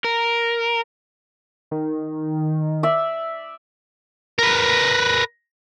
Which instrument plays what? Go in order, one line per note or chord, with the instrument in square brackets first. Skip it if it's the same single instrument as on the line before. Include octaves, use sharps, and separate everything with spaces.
[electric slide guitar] A#4
[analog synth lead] D#3
[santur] D5 E5
[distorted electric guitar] A#4 B4